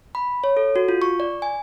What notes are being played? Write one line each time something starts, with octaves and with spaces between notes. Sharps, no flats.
B5
C#5
A4
F#4
F4
C#6
D5
G#5